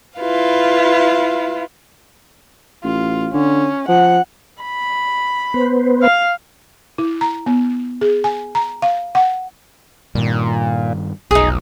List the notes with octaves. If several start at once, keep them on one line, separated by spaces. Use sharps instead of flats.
E4 F4 B4 F5
A1 F4
D3 C#4
F3 F#5
B5
B3 B4 C5
F5
E4
A#5
B3
G#4
G#5
A#5
F5
F#5
G2 A#2 D#3
F1 B1 D#4 G#4